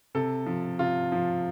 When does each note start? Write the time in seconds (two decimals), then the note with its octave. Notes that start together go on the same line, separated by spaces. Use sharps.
0.14 C3 A4
0.46 F3
0.79 C3 F4
1.12 F3